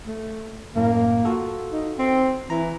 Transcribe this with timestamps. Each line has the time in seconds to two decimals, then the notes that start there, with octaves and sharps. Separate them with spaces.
0.07 A3
0.76 F#2 A2 A#3
1.25 F4 F#4 A4
1.72 D#4
1.98 C4
2.50 E3 A#5